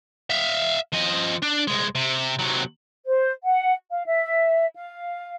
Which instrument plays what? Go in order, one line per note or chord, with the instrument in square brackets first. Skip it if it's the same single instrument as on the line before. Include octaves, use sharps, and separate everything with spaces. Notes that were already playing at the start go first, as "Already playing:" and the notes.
[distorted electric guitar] E5 F5
F3 D#5
D4
C2 G#3
C3
C3 F#3
[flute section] C5
F#5
F5
E5
F5